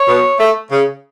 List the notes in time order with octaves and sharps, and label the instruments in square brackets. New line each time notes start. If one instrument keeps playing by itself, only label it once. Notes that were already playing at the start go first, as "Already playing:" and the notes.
Already playing: [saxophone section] C#5
B2
A3
C#3